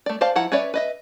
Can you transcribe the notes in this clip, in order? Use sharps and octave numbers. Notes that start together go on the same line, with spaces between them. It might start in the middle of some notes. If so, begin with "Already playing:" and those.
A3 D5
C5 D5 F5 A5
F3 E4 F#5 A#5
C#4 B4 C#5 D5 E5
B4 D#5 E5